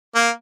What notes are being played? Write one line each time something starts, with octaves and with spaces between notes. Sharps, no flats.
A#3